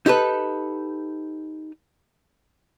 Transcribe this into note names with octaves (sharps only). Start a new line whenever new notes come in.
D#4 G4 A4 B4